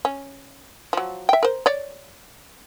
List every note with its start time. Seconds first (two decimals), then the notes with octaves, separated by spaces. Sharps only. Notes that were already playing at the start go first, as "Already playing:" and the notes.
0.05 C#4
0.93 F3 F#3
1.29 E5 G5
1.43 A#4 C5
1.66 C#5 D5